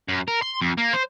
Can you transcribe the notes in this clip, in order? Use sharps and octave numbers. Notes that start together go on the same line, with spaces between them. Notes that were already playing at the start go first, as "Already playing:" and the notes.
F#2
A#4
C6
F2
A#3
C5